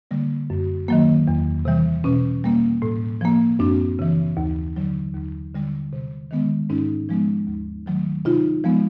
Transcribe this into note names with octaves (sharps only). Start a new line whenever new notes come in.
D3 G3 A#3
F#2
D#3 F#3 A#3
E2
C3 E3 G3
B2 C#4
G3 A#3
A2
F3 A#3
F#2 C4 D4
C#3 E3
D#2
D3 F#3
D#2
D3 G3
C3
D#3 G#3 B3
G#2 C#4 D#4
F3 G#3 B3
D#2
D#3 F#3 A3
C3 D#4 F4
F3 G#3 B3